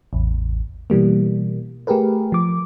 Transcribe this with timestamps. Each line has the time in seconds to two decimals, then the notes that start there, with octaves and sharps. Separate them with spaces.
0.13 A1 E2
0.90 B2 E3 G3 A#3
1.87 A3 G4 G#4 A#4 B4
2.32 F3 D6